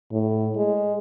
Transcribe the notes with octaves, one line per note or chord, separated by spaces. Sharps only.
A2
G#3